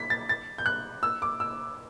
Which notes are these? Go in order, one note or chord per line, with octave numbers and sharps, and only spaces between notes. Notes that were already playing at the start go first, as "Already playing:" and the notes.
Already playing: B6
A6
A6
G6
F#6
E6
D6
E6